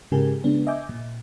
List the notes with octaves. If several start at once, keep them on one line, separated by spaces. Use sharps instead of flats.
G#2 C#3 G#3 G4 A#4 G#5
C#3 G#3 B3 D4
D#5 E5 G#5 D6 G6
A#2